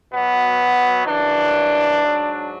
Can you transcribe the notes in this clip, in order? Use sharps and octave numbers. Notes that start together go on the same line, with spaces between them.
B2 F#3 B3
F#2 C#3 E3 D4
G#2 F#3